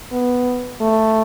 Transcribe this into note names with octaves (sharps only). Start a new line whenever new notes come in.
B3
A3